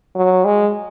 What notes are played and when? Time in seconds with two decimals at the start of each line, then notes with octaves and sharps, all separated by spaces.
0.16 F#3
0.45 G#3